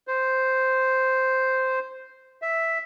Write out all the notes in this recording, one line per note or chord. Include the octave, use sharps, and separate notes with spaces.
C5
E5